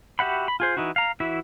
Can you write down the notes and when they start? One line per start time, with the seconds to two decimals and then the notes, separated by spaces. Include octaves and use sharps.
0.19 F#4 G4 E5 F#5 B5
0.48 B5
0.60 F4 G#4 C5
0.77 E3 D#4 E4 F#4
0.96 F5 A#5
1.20 E3 E4 F#4 E5